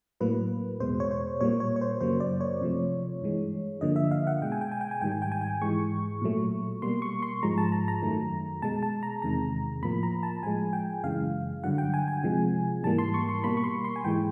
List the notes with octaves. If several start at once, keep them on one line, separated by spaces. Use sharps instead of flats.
A2 F#3 A#3 B4
E2 B2 G#3 C5
C#5
C5
A#2 G3 A#3 C#5
C#5
C#5
C5
F#2 C#3 F#3 A#3 C5
D5
C#5
C3 F3 A3
G2 E3 G#3
G2 D3 F3 A#3 D#5
E5
F5
F#5
B2 G#3 G5
G#5
G5
G#5
G5
G#5
G#2 D#3 G3 G5
G#5
G5
G#5
G5
G#2 E3 G#3 C#6
A#2 F#3 A3
B2 G3 A#3 C6
C#6
C6
G#2 F3 G#3 A#5
A5
A#5
A#5
F#2 D#3 F#3 A3
B2 G#3 A5
A5
A#5
E2 C3 D#3 G#3 A#5
A2 F3 A#3 B5
A#5
A5
A2 F3 G#3 G#5
G5
F#2 C#3 E3 G#3 F5
G2 D3 F#3 F#5
G5
G#5
G#5
C3 F3 G#3
G#2 E3 G3 A#3 A5
C6
C#6
C6
B2 G3 A#3 B5
C#6
C6
C6
G#5
G#2 E3 G#3 G5